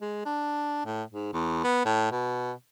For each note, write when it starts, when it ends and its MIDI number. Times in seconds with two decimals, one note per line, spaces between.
0.01 0.21 56
0.26 0.83 62
0.85 1.03 45
1.11 1.32 44
1.33 1.60 40
1.64 1.84 59
1.85 2.10 45
2.11 2.53 47